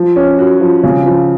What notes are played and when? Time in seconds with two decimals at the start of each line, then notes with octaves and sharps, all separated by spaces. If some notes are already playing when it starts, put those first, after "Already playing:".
Already playing: F3
0.16 C#4
0.39 F#4
0.61 F3
0.83 C#3
1.06 F3